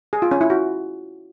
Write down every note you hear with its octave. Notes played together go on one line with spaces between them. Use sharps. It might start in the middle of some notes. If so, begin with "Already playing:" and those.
G#4
F4
C#4
E4
F#4